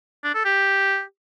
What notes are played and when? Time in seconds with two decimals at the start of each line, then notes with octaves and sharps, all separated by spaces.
0.24 D4
0.35 A4
0.45 G4